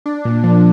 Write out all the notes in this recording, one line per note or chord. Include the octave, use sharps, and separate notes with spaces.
D4
A#2
F3